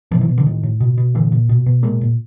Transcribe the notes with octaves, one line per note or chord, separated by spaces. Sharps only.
B2 D#3 F3
E3 F#3
B2
D3 E3
A2 D#3
A2
B2
B2
A#2 D3 E3
A#2
B2
B2
A#2 G#3 A#3
A#2